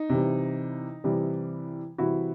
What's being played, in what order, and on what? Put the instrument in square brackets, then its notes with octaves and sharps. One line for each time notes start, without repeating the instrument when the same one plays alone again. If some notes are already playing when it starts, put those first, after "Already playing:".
Already playing: [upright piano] D#4
C3 E3 G3
C3 E3 G3
C3 E3 G3 E4 F#4